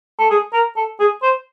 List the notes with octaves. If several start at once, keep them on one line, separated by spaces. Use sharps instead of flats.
A4
G#4
A#4
A4
G#4
C5